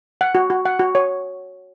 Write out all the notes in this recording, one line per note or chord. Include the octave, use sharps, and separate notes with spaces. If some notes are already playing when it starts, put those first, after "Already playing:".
F#5
F#4
F#4
F#5
F#4
C#5